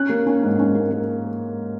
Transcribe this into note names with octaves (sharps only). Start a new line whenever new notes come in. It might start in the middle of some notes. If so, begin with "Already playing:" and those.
Already playing: C#4 F#6
A#3
C#4
G#2
C#4
A#3
A#3